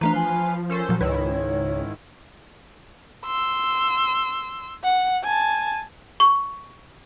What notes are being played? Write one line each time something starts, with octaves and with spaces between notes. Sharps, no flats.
E3 F3 A3 D4 B4 F5 A#5 C6
G#5
C#4 A4 A#4 C5
A#2 F3 F#3
C#2 G#2 D#3 E4 B4 C#5
C6 E6
F#5
G#5 A5
C#6